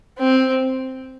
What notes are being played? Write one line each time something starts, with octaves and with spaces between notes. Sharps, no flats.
C4